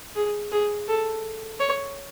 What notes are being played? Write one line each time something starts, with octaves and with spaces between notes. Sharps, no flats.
G#4
G#4
A4
C#5